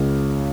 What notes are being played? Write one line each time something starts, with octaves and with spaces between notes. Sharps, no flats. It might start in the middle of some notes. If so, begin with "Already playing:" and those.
Already playing: C#2 C#3 G#3